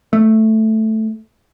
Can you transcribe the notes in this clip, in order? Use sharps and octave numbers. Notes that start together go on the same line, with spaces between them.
A3